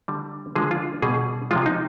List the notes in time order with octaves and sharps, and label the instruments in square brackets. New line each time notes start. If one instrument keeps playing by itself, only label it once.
[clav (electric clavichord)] D3 G3
D3 F3 G#3 G#4
F4
B2 G3 G#4
C3 F3 G#3 F4
D#4